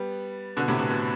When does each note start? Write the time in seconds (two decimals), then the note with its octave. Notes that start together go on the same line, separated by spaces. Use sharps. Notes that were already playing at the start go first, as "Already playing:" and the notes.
Already playing: G3 B3
0.57 B2 D3
0.68 A2 C3
0.79 B2
0.90 B2